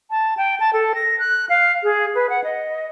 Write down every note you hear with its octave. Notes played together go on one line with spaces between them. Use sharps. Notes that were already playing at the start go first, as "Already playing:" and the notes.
A5
G5
A5
A4
A#6
F#6
F5
G#4
B4
F#5
D#5